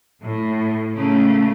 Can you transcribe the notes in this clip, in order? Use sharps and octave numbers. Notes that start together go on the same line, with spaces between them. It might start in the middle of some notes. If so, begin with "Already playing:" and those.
A2
C#3 A3 A#3